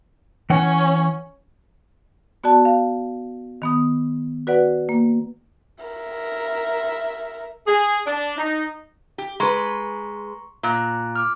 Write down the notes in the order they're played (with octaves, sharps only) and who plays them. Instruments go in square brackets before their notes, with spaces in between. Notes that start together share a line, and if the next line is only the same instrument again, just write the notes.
[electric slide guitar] E3 F#5 [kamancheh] C#4
[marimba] B3 F#4 D5 A5
F5
D#3 B3 D#6
F#4 B4 D5 F#5
A#3
[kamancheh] A#4 E5
[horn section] G#4
D4
D#4
[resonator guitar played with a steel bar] G4
[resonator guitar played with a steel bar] G#3 B4 [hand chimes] A#5 C6 C#6
[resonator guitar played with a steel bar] A#2 [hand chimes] A#5 F#6
[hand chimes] D6 F6